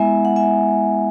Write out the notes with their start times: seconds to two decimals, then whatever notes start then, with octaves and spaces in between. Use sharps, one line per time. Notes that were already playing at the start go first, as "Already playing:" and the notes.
Already playing: G#3 B3 E4 E5 G#5
0.25 F#5
0.36 E5 G#5